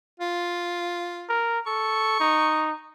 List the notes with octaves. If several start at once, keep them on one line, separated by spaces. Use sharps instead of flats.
F4
A#4
A4 C#6
D#4